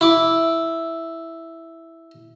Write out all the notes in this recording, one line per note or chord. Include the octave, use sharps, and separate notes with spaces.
E4 D6